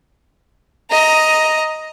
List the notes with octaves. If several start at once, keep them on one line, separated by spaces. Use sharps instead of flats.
D#5 A#5